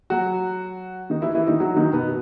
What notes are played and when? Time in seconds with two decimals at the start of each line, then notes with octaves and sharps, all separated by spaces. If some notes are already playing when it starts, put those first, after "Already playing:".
0.10 F#3 F#4
1.10 D#3 D#4
1.22 E3 E4
1.35 E3 E4
1.47 D#3 D#4
1.60 F#3 F#4
1.76 D#3 D#4
1.93 B2 B3